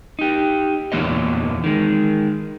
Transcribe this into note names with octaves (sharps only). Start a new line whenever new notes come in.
D#4 G4
E2 A#2 E3 A#3 C#5 D#5
D#3 G#3